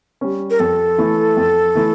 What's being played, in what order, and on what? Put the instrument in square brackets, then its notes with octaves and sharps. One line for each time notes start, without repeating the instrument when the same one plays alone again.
[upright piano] G3 C#4
[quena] A#4
[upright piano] F2 [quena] A4
[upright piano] E3 A3 E4
F2
E3 A3 E4